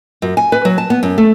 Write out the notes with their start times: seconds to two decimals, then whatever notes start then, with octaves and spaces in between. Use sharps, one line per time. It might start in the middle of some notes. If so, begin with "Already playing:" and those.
0.22 F#2
0.37 G#5
0.52 B4
0.65 F#3
0.78 A5
0.90 B3
1.03 F#2
1.18 A3